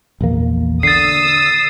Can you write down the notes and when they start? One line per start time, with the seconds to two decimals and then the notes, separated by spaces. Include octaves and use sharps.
0.21 A#1 E2 A#3
0.83 D3 D#6 E6 A6 C7